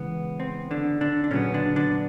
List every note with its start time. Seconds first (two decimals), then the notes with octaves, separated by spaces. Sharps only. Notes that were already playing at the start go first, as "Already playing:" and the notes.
Already playing: C#3 E3 G#3 B3
0.40 C4
0.71 D3 D4
1.01 D3 D4
1.24 D4
1.31 A#2 C#3 F#3 B3 C#4
1.54 D3 D4
1.76 D3 D4